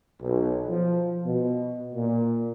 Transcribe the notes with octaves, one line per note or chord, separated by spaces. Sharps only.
B1
F3
B2
A#2